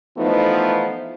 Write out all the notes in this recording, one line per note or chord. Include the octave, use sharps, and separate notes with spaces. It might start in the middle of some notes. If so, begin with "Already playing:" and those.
E3 F3 A3 B3 D#4